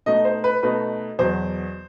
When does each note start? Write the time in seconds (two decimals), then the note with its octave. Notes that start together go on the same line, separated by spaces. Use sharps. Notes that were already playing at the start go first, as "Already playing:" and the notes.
0.06 B2 A3 D#4 D#5
0.25 C5
0.44 B4
0.63 B2 A3 D#4 B4
1.19 E2 B2 F#3 C5